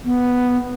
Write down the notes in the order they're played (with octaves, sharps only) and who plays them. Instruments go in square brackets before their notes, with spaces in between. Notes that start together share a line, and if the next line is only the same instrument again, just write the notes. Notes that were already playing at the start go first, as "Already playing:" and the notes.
[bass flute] B3